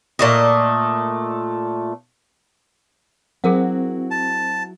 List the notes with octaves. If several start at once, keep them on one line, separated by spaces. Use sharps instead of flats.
A#2 A3 D#5
F#3 C4 E4 F#4 G#4 A#4 F#5
A5